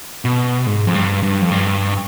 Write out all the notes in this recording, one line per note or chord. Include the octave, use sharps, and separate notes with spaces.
B2
G#2
F2
G2
G2
F2
G2